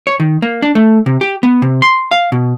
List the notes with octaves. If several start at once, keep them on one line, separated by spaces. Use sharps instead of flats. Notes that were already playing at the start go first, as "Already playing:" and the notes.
C#5
D#3
A#3
D4
A3
C3
G4
B3
C3
C6
F5
B2